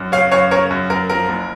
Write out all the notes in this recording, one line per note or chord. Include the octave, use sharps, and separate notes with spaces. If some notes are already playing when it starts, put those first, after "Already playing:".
Already playing: F#2
C#3 C#5 F5
F#2 C#5 F5
C#3 A#4 C#5
F#2
F#2 A#4
F3 A#4
F#1